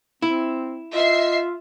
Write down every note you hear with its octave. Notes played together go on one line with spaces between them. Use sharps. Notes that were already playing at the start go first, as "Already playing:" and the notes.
C4 E4
F4 D#5 E5 C7